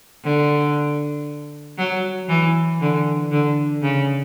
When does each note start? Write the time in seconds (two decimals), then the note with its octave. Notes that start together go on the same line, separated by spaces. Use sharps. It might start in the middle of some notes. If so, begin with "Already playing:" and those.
0.24 D3
1.78 F#3
2.29 E3
2.81 D3
3.31 D3
3.82 C#3